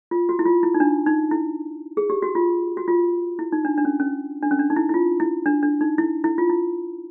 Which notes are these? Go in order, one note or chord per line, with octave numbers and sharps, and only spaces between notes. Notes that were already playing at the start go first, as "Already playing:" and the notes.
F4
F#4
E4
F4
E4
D#4
D4
D#4
E4
G#4
G4
F#4
F4
F#4
F4
E4
D#4
D4
D4
C#4
C#4
D4
C#4
D4
D#4
E4
E4
F4
E4
D4
D4
D#4
E4
E4
F4
E4